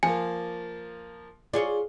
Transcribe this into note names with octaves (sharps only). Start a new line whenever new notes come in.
F3 A#3 G#5
F4 G#4 C#5 D5